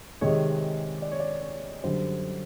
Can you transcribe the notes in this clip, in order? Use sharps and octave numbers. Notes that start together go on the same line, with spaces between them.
C3 D#3 G#3 C#5
D5
C#5
D5
C#5
F#2 D3 G3 C5